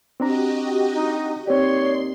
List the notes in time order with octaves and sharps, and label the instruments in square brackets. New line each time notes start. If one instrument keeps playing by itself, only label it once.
[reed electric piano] C4 D4 A#5 [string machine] F#4 G4 D#5
[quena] D#4
[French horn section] D#2 D#4 D5 [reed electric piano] C4 G4 [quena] C#5 [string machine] C6